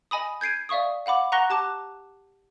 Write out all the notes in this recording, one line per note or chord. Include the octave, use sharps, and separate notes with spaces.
D#5 G#5 B5 D#6
G6 G#6 C7 D7 D#7
D5 E5 F5 C#6 D#6
F5 F#5 B5 D6
F#5 A#5 C#6 F#6 A#6 G7
G4 A5 D6 F#6